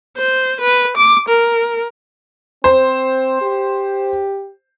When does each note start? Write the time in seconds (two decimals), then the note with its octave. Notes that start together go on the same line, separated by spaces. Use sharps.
0.17 C5
0.60 B4
0.97 D6
1.28 A#4
2.64 C4 C5
3.41 G4